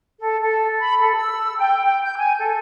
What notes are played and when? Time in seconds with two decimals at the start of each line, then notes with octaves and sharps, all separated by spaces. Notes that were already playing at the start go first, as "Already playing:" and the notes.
0.20 A4
0.42 A4
0.79 B5
1.01 A4
1.15 E6
1.58 G5
1.86 G5
2.04 G6
2.19 G#5
2.39 A4